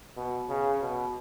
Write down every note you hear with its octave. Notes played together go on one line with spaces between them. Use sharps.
B2
C#3
B2